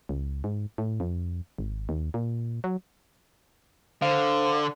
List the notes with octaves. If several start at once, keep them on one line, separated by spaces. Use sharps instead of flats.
C#2
G#2
A2
F2
G#1
D#2
A#2
F#3
D3 C5 F5